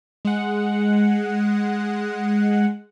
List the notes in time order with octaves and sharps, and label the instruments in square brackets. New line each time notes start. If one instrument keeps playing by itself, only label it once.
[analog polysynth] G#3 F#5